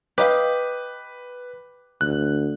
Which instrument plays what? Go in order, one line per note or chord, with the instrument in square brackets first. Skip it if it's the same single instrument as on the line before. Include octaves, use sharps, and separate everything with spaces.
[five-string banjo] G4 D#5 F5 [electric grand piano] B4
[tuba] D2 [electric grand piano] F#6